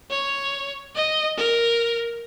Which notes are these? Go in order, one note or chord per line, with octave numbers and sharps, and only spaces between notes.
C#5
D#5
A#4